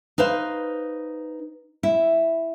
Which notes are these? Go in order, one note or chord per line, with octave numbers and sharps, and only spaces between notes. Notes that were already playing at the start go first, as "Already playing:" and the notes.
D#4 B4 C5 F5
E4